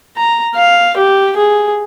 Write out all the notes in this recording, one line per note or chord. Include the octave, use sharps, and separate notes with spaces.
A#5
F5
G4
G#4